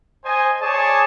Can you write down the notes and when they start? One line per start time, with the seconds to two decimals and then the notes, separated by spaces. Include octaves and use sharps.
0.24 C5 D#5 G#5
0.61 G#4 C#5 D5 G#5 A5